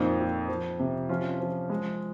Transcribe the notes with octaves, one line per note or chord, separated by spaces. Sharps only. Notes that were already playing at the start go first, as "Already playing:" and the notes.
Already playing: F2 A#2 C4 D#4
F3
F3
C3
F3 C#4 F4
F3
G#3